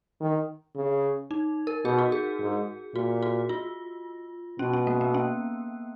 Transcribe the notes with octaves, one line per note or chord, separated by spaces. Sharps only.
D#3
C#3
D#4
A#4
B2 G#4
F#4
G#4
G#2
A#2 F#4
F#4
F4
B2 C#4
C#4
A#3
B3
C#4